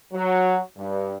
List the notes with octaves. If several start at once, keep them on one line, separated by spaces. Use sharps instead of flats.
F#3
G2